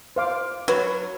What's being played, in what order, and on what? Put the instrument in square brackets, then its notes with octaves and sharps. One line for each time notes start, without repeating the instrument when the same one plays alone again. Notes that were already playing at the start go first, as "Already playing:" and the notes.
[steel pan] C5 F5 D6
[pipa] F#3 [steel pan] B4